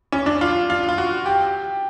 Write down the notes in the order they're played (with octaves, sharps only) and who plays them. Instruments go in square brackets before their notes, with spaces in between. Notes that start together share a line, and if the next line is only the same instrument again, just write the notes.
[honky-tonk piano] C#4
D4
F4
F4
F4
F#4
G4